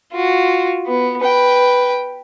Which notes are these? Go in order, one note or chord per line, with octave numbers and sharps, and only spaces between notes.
F4 F#4
B3
B4 G5